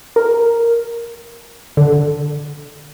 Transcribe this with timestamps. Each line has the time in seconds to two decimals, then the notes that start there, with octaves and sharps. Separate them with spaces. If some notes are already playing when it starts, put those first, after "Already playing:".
0.16 A#4
1.77 D3